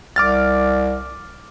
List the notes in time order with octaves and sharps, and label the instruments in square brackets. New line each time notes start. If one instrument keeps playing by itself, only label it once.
[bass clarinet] C2 [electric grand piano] D6 F6 A6